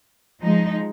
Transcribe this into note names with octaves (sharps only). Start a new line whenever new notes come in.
F3 G#3 D#4